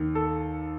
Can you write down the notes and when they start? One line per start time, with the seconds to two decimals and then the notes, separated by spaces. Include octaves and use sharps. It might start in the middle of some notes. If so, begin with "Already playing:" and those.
Already playing: D#2 D#3
0.15 A4